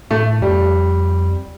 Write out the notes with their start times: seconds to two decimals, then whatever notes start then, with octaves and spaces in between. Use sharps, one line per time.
0.11 A2 A3
0.42 F2 G3